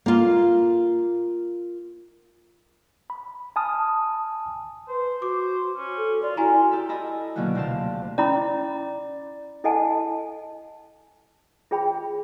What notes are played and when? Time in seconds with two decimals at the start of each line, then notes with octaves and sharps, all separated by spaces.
0.06 A#3 F4
3.10 B5
3.56 G#5 A5 B5 D#6 F6
4.88 B4 C5
5.22 F#4 D6
5.77 C#4
5.98 A4
6.22 F4 D5
6.37 E4 F#4 G#5 A#5
6.72 G4 A4 E5
6.89 E4 A4 D#5 G#5 B5
7.35 B2 D3 D#3 F#3 A#3 B3
7.55 D2 C3 C5 F5 A5
8.18 C#4 E4 D5 B5
9.64 E4 A4 D#5 F#5 G#5 A5
11.71 F4 G#4 C#5 G5 B5